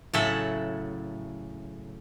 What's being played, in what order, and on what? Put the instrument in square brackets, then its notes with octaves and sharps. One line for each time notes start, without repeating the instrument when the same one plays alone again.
[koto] A2 C#3 F#3 A4 E5 F#5